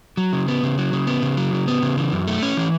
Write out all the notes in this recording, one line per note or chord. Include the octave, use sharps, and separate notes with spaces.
F#3
C#3
B3
C#3
F#3
C#3
B3
C#3
F#3
C#3
B3
C#3
E3
F#2
A3
C#4
E3